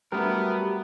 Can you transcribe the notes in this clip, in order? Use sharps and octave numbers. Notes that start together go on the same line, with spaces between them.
F#3 G3 A3 B3 A#4